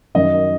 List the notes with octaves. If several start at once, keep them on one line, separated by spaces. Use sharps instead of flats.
F#2 D#3 F#3 D#5